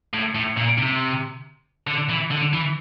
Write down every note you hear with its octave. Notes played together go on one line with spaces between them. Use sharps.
A2
A2
A#2
C3
D3
E3
D3
E3